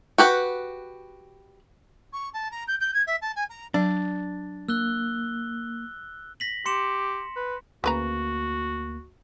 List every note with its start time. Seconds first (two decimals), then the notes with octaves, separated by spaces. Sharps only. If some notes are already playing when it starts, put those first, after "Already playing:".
0.18 F#4 G4 B4
2.12 C#6
2.33 A5
2.50 A#5
2.67 G6
2.80 G6
2.93 G#6
3.06 E5
3.21 A5
3.35 G#5
3.49 A#5
3.74 F#3 D4
4.69 A#3 E6 F#6 G7
6.40 A#6 B6 F#7
6.66 G4 C6 C#7 E7
7.36 B4
7.84 D2 C#3 A#3 F#4 B4 A#5